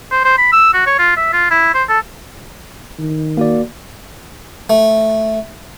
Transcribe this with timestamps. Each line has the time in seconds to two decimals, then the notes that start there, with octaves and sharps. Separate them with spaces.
0.11 C5
0.25 C5
0.38 B5
0.52 E6
0.74 F#4
0.86 C#5
0.99 F4
1.17 E5
1.33 F4
1.51 E4
1.74 C5
1.89 A4
2.99 D#3
3.37 A#3 F#4 D5
4.70 A3